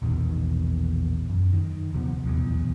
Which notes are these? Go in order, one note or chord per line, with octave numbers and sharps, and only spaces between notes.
A#1 E2 B2 D#3
F#2
D#3
D#1 C3 F3 B3
D#1 B1 E2